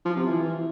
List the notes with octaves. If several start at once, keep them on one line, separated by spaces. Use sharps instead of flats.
F3
C3
E3